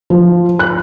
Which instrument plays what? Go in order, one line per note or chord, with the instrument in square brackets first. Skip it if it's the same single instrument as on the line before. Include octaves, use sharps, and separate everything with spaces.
[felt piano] F3
F#6